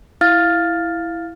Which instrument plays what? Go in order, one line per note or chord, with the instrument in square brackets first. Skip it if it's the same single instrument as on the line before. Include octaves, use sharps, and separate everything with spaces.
[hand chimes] E4 F5 F6 A6